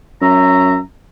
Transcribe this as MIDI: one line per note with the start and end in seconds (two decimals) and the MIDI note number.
0.21 0.79 42
0.21 0.76 73
0.21 0.76 76
0.21 0.76 82